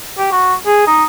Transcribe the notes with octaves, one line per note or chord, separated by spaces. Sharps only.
G4
F#4
G#4
D#4